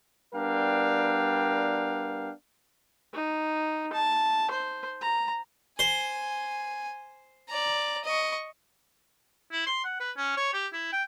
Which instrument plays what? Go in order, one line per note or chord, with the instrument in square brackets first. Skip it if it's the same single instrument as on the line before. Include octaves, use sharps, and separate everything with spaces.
[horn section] G3 B3 D4 A#4 F5 G5
[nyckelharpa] D#4
A5
C5
A#5
[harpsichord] C5 [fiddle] G#5
[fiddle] D5 A#5
D#5 C#6
[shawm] E4
C6
F#5
B4
C#4
C#5
G4
E4
G5